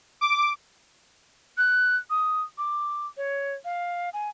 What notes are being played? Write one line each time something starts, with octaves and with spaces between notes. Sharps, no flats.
D6
F#6
D#6
D6
C#5
F5
G#5